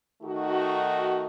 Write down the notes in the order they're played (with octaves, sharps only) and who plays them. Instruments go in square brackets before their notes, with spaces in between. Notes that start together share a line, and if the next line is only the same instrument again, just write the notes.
[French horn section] D#3 A3 D#4 F#4